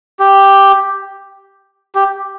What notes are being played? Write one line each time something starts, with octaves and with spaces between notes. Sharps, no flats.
G4
G4